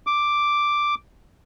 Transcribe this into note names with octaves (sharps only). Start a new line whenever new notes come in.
D6